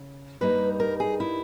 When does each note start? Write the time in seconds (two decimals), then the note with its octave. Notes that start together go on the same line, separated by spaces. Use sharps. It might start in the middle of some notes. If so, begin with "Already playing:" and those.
Already playing: C#3
0.41 G2 G3 A#3 D#4 B4
0.80 A#4
1.00 G#4
1.20 E4